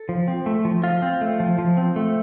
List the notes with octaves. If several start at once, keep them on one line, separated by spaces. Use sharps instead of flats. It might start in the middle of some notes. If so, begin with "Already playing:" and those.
Already playing: A4
F3
C4
A3
F3
F3 F4
C4
A3
F3
F3
C4
A3